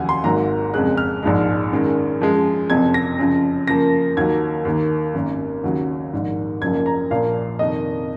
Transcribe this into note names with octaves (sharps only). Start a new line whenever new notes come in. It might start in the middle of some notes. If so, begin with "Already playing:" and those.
Already playing: F1 D#2 C#3 F#3 F#5 G#5
C6
G#1 G#2 F#3 A#3 A#5
F#1 F2 C#3 G#3 F#6
F6
A#1 G#2 F3 G#3
F#2 D#3 G#3
F#2 F3 G#3
F#1 F2 C3 F3 G#6
A#6
F#2 C#3 F3
F#2 C#3 F3 A#3 A#6
D#2 D#3 F#3 A#3 G#6
D#2 D#3 A#3
G#1 F#2 D#3 A#3
D#2 C#3 F#3
A#1 G#2 D#3
F#1 F#2 F3 A#3 G#6
A#5
A#1 A#2 F3 A#3 F5
F2 C3 D#3 D#5